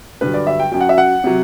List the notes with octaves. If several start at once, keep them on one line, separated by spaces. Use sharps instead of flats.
G2 D3 F#3 B4
D5
E5
G5
F#2 F#3 G5
F#5
E5
F#5
C3 F#3